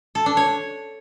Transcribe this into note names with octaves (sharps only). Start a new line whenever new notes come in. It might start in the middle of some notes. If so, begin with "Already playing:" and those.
A4
D4
C#5